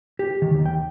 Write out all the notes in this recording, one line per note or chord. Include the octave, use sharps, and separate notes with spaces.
G4
D#3
D#2
G5